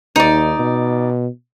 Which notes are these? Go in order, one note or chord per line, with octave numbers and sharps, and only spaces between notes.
D#2 D#4 D5
B2